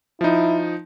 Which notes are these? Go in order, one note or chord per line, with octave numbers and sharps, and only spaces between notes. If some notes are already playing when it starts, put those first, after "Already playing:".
F3 D#4 E4